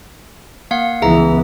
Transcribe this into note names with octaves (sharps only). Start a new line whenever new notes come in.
A#3 F5 F#5
C#2 E3 B3 G#4 E5 A#5